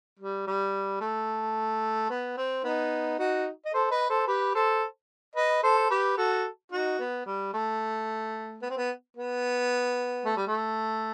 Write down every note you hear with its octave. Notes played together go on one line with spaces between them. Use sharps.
G3
G3
A3
B3
C4
B3 D#4
D#4 F#4
D#5
A4 C5
B4 D#5
A4 C5
G4 B4
A4 C5
B4 D#5
A4 C5
G4 B4
F#4 A4
D#4 F#4
B3
G3
A3
B3
C4
B3
B3
A3
G3
A3